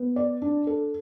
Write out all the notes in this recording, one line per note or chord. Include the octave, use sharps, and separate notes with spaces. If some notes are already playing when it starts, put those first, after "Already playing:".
Already playing: B3
D5
D4
A4